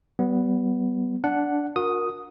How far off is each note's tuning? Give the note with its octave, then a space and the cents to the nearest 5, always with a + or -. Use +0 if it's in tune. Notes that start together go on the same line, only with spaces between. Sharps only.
G3 -40 B3 +0
D4 -10 F#5 +0
F#4 -40 A#4 +5 D#6 +0